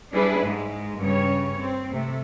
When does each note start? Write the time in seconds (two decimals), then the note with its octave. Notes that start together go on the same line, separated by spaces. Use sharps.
0.13 G3 D4 E4 G#4 B4
0.43 G#2 G#3
0.99 G2 C#3 C#5
1.60 C4
1.92 C3 A3